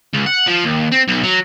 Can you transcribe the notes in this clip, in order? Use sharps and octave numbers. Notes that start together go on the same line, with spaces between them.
C#2
F#5
F3
D#2
C4
B1
F#3